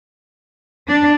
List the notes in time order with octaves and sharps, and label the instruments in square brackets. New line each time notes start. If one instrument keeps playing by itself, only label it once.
[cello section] D4